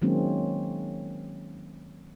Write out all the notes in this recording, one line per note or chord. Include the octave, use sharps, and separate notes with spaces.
D#3 F#3 G#3 A#3 C4 C#4